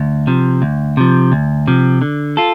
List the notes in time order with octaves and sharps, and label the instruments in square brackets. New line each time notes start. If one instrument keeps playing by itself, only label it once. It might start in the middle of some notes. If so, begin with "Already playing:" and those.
Already playing: [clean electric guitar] D2
C3 F3
D2
C3 F3
D2
C3 F3
D3
F4 A4